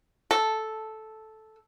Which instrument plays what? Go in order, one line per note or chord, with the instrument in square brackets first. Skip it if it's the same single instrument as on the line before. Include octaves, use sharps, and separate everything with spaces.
[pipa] A4